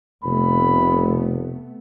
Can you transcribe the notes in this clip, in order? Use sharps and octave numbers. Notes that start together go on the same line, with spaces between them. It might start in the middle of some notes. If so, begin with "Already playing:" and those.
F1 C3 A3 B3 B5